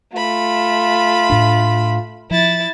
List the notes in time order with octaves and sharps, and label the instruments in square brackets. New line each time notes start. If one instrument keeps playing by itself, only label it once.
[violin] A3 B5 [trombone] F4
[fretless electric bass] A2 D4
[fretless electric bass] F3 [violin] E4 A6